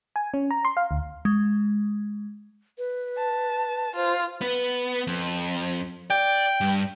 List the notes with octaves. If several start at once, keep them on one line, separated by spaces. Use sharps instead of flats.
G#5
C#4
A#5
C6
F5
D2
G#3
B4
A5
F4 C5
B3
F2
D5 G5
G2